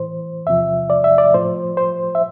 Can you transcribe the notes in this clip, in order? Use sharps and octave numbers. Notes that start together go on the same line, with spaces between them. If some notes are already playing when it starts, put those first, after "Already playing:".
Already playing: A2 E3 C5
E2 C3 F3 E5
D5
E5
D5
A2 F3 C5
C5
E5